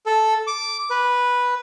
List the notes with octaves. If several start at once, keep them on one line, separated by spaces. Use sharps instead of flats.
A4
D6
B4